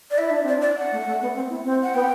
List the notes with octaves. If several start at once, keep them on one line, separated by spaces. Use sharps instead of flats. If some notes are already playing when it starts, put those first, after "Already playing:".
D5
E4 E5
D4
C4 D5
D4
D5
F#5
A3
A3
B3
C4
E4
C4
F#5
B3 G5